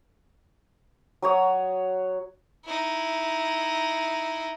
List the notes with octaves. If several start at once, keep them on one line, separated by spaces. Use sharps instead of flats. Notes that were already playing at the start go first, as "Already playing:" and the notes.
F#3 F#4 C#5 D#6
D#4 E4